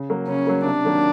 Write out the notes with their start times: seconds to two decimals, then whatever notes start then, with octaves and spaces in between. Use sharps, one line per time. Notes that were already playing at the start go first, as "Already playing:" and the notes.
Already playing: C#3
0.09 F#3 A#3
0.28 C#3 C#4
0.47 F#3 A#3
0.65 C3 D4
0.84 D#3 F#3 A#3